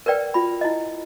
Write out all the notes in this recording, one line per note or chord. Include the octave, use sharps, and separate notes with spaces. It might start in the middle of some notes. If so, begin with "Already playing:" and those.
A#4 B4 D5 G5
F4 B5
E4 D#5